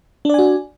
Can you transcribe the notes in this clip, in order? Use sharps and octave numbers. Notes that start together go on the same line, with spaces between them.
D4 F#4 D5 G#5